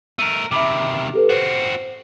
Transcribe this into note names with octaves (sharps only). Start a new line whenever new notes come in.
A3 A#4 D#7
C3 D#3 E5 B5 D6
G4 A4 B4
C4 F#4 C5